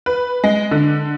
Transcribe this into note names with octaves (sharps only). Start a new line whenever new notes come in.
B4
G#3
D3